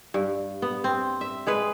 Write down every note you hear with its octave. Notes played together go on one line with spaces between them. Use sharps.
G2
B3
C4
E5
G#3 G#4 B4